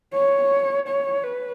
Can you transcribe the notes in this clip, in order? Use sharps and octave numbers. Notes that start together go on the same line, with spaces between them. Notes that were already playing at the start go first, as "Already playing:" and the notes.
C#5
C#5
B4